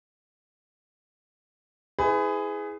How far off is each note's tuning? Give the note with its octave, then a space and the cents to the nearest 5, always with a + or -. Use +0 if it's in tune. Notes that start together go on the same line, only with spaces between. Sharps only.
E4 -25 G#4 +0 B4 +35